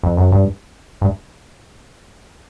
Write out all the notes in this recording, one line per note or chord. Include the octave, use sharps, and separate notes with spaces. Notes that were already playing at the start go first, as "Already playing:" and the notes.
F2
F#2
G2
G2